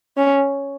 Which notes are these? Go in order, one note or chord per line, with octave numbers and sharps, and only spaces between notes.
C#4